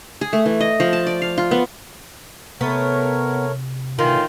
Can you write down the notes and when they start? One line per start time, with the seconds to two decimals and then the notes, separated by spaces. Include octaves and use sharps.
0.21 G#4
0.33 A3
0.46 E3
0.61 D#5
0.80 F3
0.93 A5
1.07 D5
1.22 F5
1.38 F4
1.51 B3
2.61 C3 A3 B3 A#4 C#5
3.99 A2 D#3 E3 F4